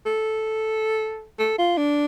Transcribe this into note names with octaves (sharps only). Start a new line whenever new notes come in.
A4
A4
F4
D4